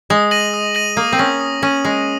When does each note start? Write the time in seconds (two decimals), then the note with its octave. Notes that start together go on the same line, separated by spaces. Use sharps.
0.10 G#3 D#6
0.31 A#6 D#7 F#7
0.54 D#6
0.75 A#6 D#7 F#7
0.97 A#3 D#6
1.13 C4
1.19 C#4 A#6 D#7 F#7
1.40 D#6
1.63 C#4 A#6 D#7 F#7
1.84 G#3 D#6